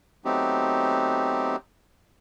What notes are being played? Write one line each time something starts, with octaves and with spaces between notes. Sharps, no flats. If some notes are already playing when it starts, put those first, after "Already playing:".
F#3 A3 B3 C4 D#4 G4